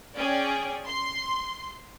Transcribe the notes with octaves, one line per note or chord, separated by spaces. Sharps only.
C#4 G#4 D5 G5
C6